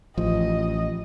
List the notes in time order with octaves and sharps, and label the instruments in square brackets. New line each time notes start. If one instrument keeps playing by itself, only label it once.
[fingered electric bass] A1 [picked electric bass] F3 [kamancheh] D#5